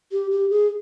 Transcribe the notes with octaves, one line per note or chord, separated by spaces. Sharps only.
G4
G4
G#4